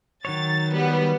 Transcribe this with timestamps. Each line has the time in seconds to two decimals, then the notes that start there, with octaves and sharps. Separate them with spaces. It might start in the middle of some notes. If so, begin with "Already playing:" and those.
0.25 D#3 F#3 C#5 A6
0.72 G3 B3